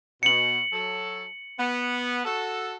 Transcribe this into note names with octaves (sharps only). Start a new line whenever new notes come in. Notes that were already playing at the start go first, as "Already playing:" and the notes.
B2 C#7 F#7
F#3 A4
B3
F#4 A4